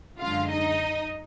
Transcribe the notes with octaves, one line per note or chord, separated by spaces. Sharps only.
F#2 D3 G#3 F4 F5
D#4 D#5